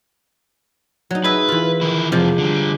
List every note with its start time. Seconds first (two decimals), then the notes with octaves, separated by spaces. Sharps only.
1.11 F#3 D#4
1.24 G#4 B4 D#5 E5
1.48 E3 F4
1.81 D#3 E4
2.12 F2 C3 F3 G#3
2.38 D3 G3